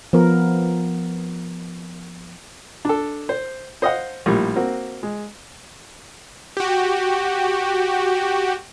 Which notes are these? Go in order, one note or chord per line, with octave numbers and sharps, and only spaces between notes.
F3 B3 A#4
D4 A4
C5
C5 D#5 F5 F#5
A#1 A2 G3
A#3 C4 F#4
G#3
F#4 G4